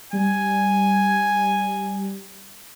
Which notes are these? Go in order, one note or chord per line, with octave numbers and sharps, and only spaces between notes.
G3 G#5